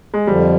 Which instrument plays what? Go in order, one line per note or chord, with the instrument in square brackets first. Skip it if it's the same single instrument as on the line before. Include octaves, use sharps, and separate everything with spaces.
[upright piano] G#3
[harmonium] F2 D3 F3 [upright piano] G3